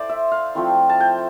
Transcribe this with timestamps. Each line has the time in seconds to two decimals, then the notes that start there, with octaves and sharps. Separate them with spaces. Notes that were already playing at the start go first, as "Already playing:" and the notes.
Already playing: A3 E4 C5 D5
0.09 E5
0.32 F5
0.55 F3 A3 C4 E4
0.89 A5
1.00 G5